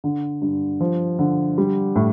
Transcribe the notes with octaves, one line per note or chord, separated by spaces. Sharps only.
D3
G2
F3
D3
G3
A2